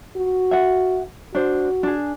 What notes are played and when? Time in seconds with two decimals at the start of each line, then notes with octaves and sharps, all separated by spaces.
0.17 F#4
0.51 E5 F#5
1.35 D4 F#4 C5
1.83 D4 G#4